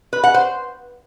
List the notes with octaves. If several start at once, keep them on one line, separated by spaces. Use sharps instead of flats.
B4
F#5
C5